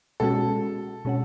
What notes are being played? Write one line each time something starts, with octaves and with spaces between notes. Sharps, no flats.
B2 G#3 C#4 F#4 A4
B2 G#3 C#4 F#4